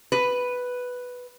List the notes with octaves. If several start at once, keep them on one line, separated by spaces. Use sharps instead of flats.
B4